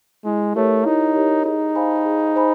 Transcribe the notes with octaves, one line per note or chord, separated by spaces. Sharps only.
G#3 E4
A3 G4 A#4 C#5
D#4 E4
G4 A#4 C#5
D#4 G#4
C5 F5 G#5 B5
G#4
C5 F5 G#5 B5